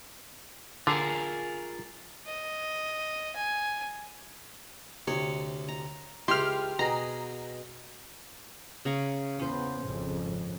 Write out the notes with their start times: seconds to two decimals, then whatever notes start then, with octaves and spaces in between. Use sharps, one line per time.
0.87 D3 F4 G#4 A#4
2.27 D#5
3.36 G#5
5.07 D2 C3 C#5
5.68 A#5
6.28 C#2 E4 G4 C6 F6
6.79 B2 G#4 A#5
8.85 C#3 A#5 C#6
9.39 E2 B3 C#4 C5
9.83 G#1 F2 C#3